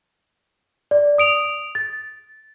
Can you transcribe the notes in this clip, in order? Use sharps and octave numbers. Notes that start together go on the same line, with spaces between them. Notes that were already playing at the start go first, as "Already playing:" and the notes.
D5
D#6 D7 F7
A6